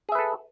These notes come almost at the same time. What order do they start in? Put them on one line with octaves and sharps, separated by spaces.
G#4 E5 B4 A4